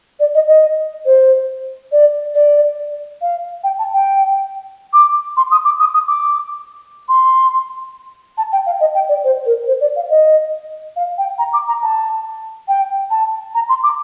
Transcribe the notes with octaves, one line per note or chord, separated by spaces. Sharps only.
D5
D#5
D#5
C5
D5
D5
F5
G5
A5
G5
D6
C6
D#6
D6
D#6
D#6
D6
C6
A5
G5
F5
D#5
G5
D5
C5
A#4
C5
D5
F5
D#5
F5
G5
A#5
D6
A#5
A5
G5
A5
A#5
C6
D6